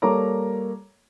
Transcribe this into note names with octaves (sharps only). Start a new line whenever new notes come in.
G3 A#3 A4 C#5 A#5 D6